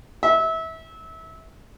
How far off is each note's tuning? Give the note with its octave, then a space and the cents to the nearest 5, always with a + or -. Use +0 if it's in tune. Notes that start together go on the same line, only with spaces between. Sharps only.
E5 -25